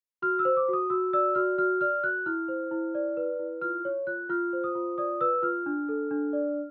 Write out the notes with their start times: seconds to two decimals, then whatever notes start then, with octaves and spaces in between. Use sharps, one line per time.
0.22 F#4 F6
0.39 E6
0.45 C5
0.57 D6
0.69 F#4 D#6
0.90 F#4 E6
1.13 D5 E6
1.35 F#4 F6
1.58 F#4 F6
1.81 D5 F6
2.03 F#4 F#6
2.26 E4 F6
2.48 C5
2.71 E4
2.95 D5
3.17 B4
3.39 E4
3.61 F4 F6
3.85 C#5
4.07 F4 F#6
4.29 F4 F6
4.53 C5
4.64 D#6
4.75 F4
4.98 D5 D#6
5.21 B4 E6
5.42 F4 F6
5.66 D4
5.89 A4
6.11 D4
6.33 D5